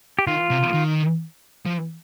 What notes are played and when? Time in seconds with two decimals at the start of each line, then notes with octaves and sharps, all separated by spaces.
0.19 G4
0.27 D#3 F4
0.50 C3
0.74 D#3
1.66 F3